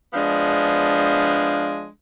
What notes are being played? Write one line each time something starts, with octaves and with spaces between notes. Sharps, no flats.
F3 G#3 B3 D4